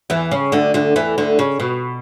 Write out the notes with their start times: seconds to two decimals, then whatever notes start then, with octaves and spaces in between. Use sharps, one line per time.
0.10 E2 E3
0.31 C#3
0.52 D2 D3
0.74 D2 D3
0.96 E2 E3
1.18 D2 D3
1.39 C#3
1.60 B2